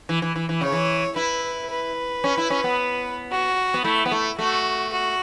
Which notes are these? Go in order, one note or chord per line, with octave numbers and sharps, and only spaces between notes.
E3
E3
E3
E3
C#3 C#5
E3
E4 B4
B4
C#4
E4
C#4
B3
F#4
B3
A3 E4
B3
A3
A3 F#4
F#4